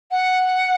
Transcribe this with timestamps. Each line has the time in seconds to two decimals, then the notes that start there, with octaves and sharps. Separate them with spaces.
0.11 F#5